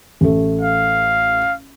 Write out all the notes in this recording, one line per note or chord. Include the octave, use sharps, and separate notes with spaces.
A1 A3
F5